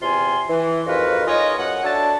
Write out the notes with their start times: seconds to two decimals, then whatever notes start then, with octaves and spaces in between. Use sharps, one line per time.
0.02 E2 C3 C4 F4 G#5 C6
0.49 E3
0.87 F2 G#2 F4 F#4 A#4 B4
1.27 D#4 F4 G#4 A#4 C#5 D#5
1.58 F#2 F#5
1.84 D4 F#4 A4 C#5 E5 A5